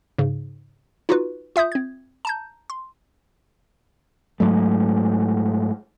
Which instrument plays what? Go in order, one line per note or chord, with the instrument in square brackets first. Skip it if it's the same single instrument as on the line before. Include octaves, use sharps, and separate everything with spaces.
[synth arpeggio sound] G#2 C#3
D#4 F4 F#4 B4
F4 E5 D#6 G6
C4 G#6
A5 A#5 G6
C6
[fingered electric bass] G#2 F#3 A3